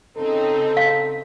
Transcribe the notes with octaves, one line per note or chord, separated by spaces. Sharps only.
C#3 C4 D#4 A4
F5